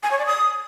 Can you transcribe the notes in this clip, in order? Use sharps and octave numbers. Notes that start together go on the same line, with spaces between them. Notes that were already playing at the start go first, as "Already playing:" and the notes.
G#5
C#5
D5
D#6